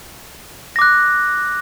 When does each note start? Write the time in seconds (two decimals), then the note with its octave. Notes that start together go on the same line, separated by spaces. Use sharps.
0.76 A#6
0.79 D6
0.82 F#6